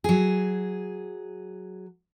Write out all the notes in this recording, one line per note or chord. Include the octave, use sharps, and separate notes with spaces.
F#3 G#4